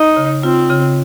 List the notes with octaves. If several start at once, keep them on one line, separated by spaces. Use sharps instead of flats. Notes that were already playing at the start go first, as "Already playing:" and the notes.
Already playing: D#4
C#3
C4 F4
C#3